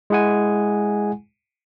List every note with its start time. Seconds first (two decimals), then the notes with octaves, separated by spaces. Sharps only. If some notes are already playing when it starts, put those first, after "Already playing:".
0.10 G#3 E4 G#4 F#5 G#5